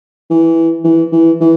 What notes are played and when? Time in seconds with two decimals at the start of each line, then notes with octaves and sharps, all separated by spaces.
0.30 E3
0.85 E3
1.12 E3
1.40 E3